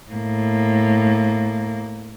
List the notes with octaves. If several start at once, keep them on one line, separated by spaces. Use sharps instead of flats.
A2 A#3